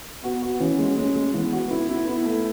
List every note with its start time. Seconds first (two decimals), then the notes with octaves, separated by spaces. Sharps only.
0.24 B3 F#4
0.42 F#4
0.60 E3 C#4
0.79 G#3
0.97 G#3 C#4
1.15 G#3
1.34 E3 B3
1.53 F#4
1.71 B3 E4
1.89 E4
2.07 B3 E4
2.25 A3